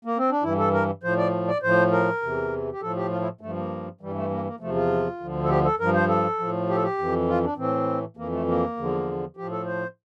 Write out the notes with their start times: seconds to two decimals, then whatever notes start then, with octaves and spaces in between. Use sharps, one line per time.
0.05 A#3
0.17 C4
0.31 D4
0.43 G2 E3 E4
0.59 A4
0.73 A#4
1.03 A2 F3 C5
1.17 D5
1.48 D5
1.62 A2 F3 C5
1.92 A#4
2.22 E2 C3 E3
2.72 G4
2.82 A2 F3 A4
2.96 G4
3.11 F4
3.21 E4
3.41 G2 F3 A3
3.56 A#3
4.01 G2 E3 G3
4.15 A3
4.31 A#3
4.45 A#3
4.60 E2 C3 F3 A3
4.75 F4
5.19 D2 D3 F3
5.43 A4
5.49 G4
5.65 A4
5.79 G2 F3 A#4
5.95 C5
6.09 A4
6.39 A2 F3
6.69 G4
6.76 A4
6.83 G4
6.98 F2 E3
7.28 F4
7.44 D4
7.57 A2 E3 C4
8.17 F2 E3 A#3
8.32 A3
8.48 A#3
8.77 E2 D3 F3
9.37 A2 F3 G4
9.52 A4
9.66 C5